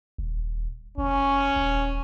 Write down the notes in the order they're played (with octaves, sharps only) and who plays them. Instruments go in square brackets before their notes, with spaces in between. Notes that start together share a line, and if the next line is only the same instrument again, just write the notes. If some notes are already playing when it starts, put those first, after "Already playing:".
[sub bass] D#1
[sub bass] F1 [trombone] C#4
[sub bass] D#1